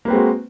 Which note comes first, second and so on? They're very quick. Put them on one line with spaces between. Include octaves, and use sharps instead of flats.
A#3 B4 C4 G#3 F#4